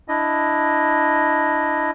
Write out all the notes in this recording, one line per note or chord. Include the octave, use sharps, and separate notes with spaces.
D4 E4 D#5